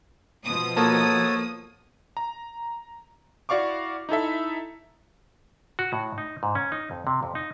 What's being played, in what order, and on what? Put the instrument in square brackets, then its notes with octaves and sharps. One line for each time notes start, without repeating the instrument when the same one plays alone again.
[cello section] B2 F3 [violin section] D#6
[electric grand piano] A#3 A5 [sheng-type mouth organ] F#4 A4 C#5
[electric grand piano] A#5
E4 F#4 D5 F5 C#6 D6
D#4 E4 A4 E5
[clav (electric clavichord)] F#4
A2
D#4
G#2
C#4
D#4
F2
C3
F2
D#4